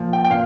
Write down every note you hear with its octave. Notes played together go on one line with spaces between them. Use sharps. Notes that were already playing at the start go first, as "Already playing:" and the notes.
Already playing: A#2 F3
G5
G5
A#2 F5